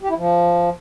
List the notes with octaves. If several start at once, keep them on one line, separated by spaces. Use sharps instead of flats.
G4
E4
F3